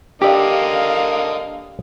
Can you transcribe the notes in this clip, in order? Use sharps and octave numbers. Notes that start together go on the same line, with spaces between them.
D3 A#3 G4 D5 D#5 F5